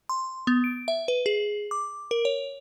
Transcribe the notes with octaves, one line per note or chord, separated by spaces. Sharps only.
C6
B3
D7
E5
B4
G#4
D6
A#4
C#5